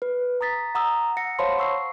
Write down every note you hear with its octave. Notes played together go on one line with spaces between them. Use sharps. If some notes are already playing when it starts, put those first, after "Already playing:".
B4
A#5 D#6 A6 B6
F#5 A#5 D#6 E6
F#5 A#6 C#7
C5 C#5 F5 A5 B5 C6
C#6 E6 C7